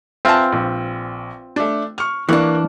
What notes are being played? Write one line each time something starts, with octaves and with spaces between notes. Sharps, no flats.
C4 F4 B4 E5 G#5 A5
A#1
A3 D4
C#6 F6
E3 A#3 D4 C#6 F#6